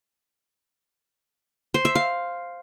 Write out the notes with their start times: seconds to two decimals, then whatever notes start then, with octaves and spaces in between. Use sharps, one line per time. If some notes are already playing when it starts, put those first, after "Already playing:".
1.74 C5
1.85 E5
1.95 F5